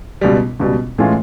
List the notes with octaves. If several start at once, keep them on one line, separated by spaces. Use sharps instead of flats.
C#2 B2 G3
C#2 B2 G3
A2 E3 G#3 C#4 F4